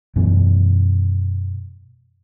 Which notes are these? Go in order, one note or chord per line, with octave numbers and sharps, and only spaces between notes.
F#2 B2 E3